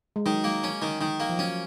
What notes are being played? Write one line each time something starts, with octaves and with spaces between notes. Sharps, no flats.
G#3
D#3 F#3
A#3
C#4
D#3
D#3
A#3
F3
F#3 C#4